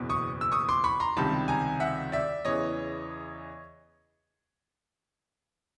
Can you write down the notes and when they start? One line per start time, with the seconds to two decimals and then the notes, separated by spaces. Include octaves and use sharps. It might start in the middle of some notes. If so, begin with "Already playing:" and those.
Already playing: F#1 E2 B2
0.10 C#6 D#6
0.41 E6
0.52 C#6 D#6
0.69 C6 D6
0.84 B5 C#6
1.00 A#5 C6
1.17 C#2 C3 D#3 G3 A5 B5
1.48 G#5 A#5
1.80 E5 F#5
2.12 D5 E5
2.45 E2 C#3 E3 C#5 D#5